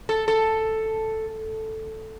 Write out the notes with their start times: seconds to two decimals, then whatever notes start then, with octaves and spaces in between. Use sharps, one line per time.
0.09 A4
0.28 A4